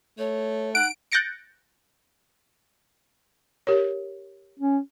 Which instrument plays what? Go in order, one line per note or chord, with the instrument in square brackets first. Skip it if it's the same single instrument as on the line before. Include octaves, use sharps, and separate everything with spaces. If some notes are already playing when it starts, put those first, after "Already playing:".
[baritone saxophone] A3 [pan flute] C#5
[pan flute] D#4 [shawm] F#5 [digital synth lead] D7
[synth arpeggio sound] F#6 G6 A6 A#6 C#7 D7
[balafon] G4 A#4 C#5
[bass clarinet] C#4